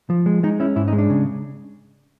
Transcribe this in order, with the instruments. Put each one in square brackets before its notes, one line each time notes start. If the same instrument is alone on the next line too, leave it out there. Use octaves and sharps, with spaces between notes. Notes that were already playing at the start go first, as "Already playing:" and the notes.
[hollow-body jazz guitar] F3
G#3
G#3 D#4
C#4 E4
G#2 E4
D#4
G#3
D4
C#3